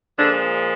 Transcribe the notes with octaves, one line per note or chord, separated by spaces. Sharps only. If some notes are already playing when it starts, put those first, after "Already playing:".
A#2 D3 F3 G#3 D4